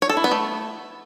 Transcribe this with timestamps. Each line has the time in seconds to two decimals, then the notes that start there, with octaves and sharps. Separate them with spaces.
0.02 C#5
0.09 A4
0.17 E4
0.24 B3
0.31 A3